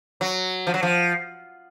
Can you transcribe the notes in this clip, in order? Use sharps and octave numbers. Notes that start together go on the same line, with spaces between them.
F#3
F3
F#3
F3